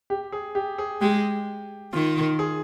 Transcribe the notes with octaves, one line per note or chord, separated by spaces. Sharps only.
G4
G#4
G4
G#4
G#3 G4
D#3 F4
G#4